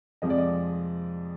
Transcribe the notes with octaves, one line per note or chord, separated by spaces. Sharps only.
F2 C3 F3 G#3 D#5
D5
D#5